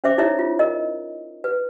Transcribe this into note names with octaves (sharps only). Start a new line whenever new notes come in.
C#4 C5 E5 D6
D#4 E4 A4 C#5 E5 A#5
F4
A#4 D#5
B4